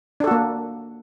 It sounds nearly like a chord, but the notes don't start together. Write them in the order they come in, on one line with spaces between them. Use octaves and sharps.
D4 A4 F#4 A#3